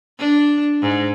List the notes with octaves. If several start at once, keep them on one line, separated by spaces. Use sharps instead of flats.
D4
G#2